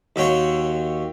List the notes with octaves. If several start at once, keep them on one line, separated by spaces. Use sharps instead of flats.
D#2 F#4 C#5 G5 C6